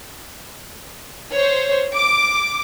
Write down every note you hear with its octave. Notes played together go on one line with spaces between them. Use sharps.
C5 C#5
D6